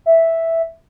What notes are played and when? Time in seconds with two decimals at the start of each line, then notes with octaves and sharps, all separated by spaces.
0.06 E5